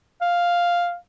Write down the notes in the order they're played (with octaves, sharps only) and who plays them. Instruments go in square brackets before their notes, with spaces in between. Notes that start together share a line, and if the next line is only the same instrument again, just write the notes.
[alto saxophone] F5